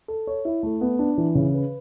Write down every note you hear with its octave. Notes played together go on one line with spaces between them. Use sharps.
A4
C#5
E4
A3
B3
D4
E3
C#3
B4